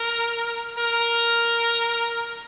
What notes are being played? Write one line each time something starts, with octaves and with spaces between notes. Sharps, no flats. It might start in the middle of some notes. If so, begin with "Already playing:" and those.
Already playing: A#4
A#4